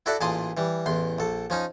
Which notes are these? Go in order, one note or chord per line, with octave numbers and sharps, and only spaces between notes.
E4 F#4 A4 D5 E5 F#5
A1 A#2 G#4 A5 C6 D#6
E3 G3
A1 E2 C6
A#1 A4
F3 C#4 D#4